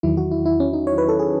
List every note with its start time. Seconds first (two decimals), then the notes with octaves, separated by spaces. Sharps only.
0.03 E2 D#3 F#3 E4
0.17 F#4
0.31 E4
0.45 E4
0.60 C#4
0.73 D#4
0.87 C#5
0.98 B4
1.09 A4
1.19 G#4